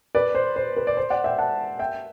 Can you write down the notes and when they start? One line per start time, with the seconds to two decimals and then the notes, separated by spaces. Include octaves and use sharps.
0.15 B4 D5
0.35 C5
0.56 C5
0.77 B4
0.87 D5
0.97 C5
1.10 D5 F#5
1.24 E5 G5
1.38 F#5 A5
1.79 E5 G5